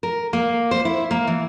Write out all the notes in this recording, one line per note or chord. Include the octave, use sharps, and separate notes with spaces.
A#4
A#3
C5
E4
A#3
E3